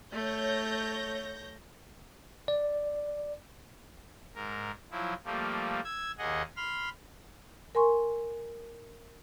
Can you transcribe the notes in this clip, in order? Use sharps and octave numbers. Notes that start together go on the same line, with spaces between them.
A3 C#5 G6 A#6
D5
G#2 A#4
F3 F#3 E4
F3 G3 A3 A#3
E6 G#6
D#2 G#4 D#5 F#5
B5 C6 F6
A#4 G#5 C6 C#6